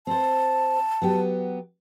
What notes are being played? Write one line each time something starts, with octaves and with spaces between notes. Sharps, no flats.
C4 C5 A5
F#3 B3 G4